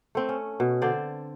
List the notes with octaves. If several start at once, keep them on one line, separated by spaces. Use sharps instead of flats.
A3 C4
C#4
B2
D3 C4 C5 D5